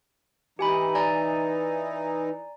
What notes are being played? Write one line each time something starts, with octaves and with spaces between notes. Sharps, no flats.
E3 D#4 G4 G#5 B5
D5 G#5 A#5